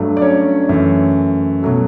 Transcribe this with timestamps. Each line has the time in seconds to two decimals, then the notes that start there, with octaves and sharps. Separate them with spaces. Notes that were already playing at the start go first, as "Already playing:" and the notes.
Already playing: G2 F#3 A3
0.17 D5
0.22 C#4 C#5
0.69 F#2 E3 A3
1.62 B2 F#3 A3